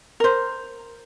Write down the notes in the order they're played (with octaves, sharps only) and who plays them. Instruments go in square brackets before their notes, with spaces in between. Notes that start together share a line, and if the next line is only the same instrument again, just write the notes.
[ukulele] A#4 C5